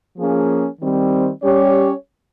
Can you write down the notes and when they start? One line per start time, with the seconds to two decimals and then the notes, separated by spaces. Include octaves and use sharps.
0.17 F3 A#3 C#4 G#4
0.80 D#3 G3 C4
1.43 G3 C#4 G4 C#5